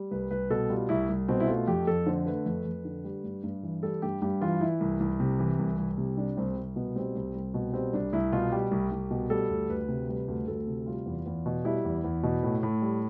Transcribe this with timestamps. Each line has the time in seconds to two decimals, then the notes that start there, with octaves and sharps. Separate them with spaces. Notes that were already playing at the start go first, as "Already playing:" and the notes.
Already playing: G3
0.11 C2 B4
0.31 C2 B4
0.50 B2 A4
0.70 G3 F4
0.89 C2 E4
1.09 C2
1.28 B2 C4
1.40 E4
1.48 A3 F4
1.67 F2 G4
1.87 F2 A4
2.07 D3 C5
2.26 A3 B4
2.46 F2
2.65 F2
2.85 D3
3.04 G3
3.24 G2
3.44 G2
3.63 E3
3.83 G3 A4
4.02 G2 G4
4.22 G2 G4
4.41 E3 F4
4.61 E3 E4
4.80 C2
5.00 C2
5.20 C3
5.39 E3
5.59 C2
5.78 C2
5.98 C3
6.17 G3 D4
6.37 C2 C4
6.57 C2
6.76 B2 B3
6.96 G3 C4
7.15 C2
7.35 C2
7.54 B2
7.73 G3 C4
7.93 C2 D4
8.13 C2 E4
8.32 B2 F4
8.52 G3 G4
8.71 C2
8.91 C2
9.11 B2
9.30 G3 A4
9.50 D2
9.69 D2 B4
9.88 C3
10.09 G3 B4
10.28 D2
10.48 D2 A4
10.67 C3
10.86 G3 F4
11.06 E2
11.26 E2
11.46 B2
11.65 G3 E4
11.84 E2
12.04 E2
12.23 B2
12.43 A2
12.63 A2
12.82 G3